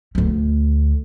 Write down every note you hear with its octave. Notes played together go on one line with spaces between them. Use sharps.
D2 A3